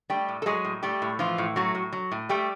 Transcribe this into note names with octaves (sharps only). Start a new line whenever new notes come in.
G3 A3 G4
A2
A4
F#3 G#3 G#4
A2
G3 A3 G4
A2
E3 F3 F4
A2
F#3 A3 F#4
A2
F#3
A2
G3 A3 G4